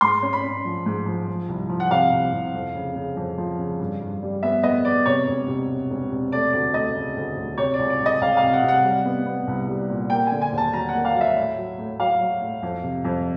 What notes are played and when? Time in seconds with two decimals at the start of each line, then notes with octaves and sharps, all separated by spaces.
0.01 G#2 C6
0.23 C#4
0.33 B5
0.44 C#4
0.65 F3
0.86 G#2
1.06 F3
1.28 F3
1.49 C2
1.69 F3
1.80 F#5
1.91 C3 F5
2.12 C2
2.33 C3
2.54 F2
2.75 C#3
2.96 C#3
3.17 F2
3.38 F3
3.59 C#3
3.79 G2
4.01 G2
4.22 G3
4.43 B3 E5
4.63 B3 D#5
4.85 B3 D5
5.06 C3 C#5
5.27 E1
5.48 C3
5.69 E1
5.90 E1
6.11 C3
6.32 A3 D5
6.53 D2 D5
6.74 A3 D#5
6.95 C#3
7.16 D2
7.37 D2
7.58 C3 C#5
7.74 D5
7.79 C#2
7.90 D5
8.00 C#2
8.06 D#5
8.21 C#2 F5
8.37 F5
8.43 C3
8.53 F#5
8.63 C3 F#5
8.84 G3
9.05 B3
9.26 B3
9.47 C2
9.68 G3
9.90 A#2
10.10 A#3 G5
10.27 G#5
10.32 D3
10.42 G#5
10.52 D#2
10.58 A5
10.73 F#3 A#5
10.89 F#5
10.94 A#3
11.05 F5
11.15 F#3
11.21 E5
11.36 A2
11.58 F#3
11.78 A2
12.00 F#3 F5
12.21 F#3
12.41 A2
12.63 F2
12.84 C3
13.04 F2